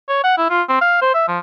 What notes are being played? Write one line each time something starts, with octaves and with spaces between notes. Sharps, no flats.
C#5
F#5
E4
F4
C4
F5
C5
E5
F3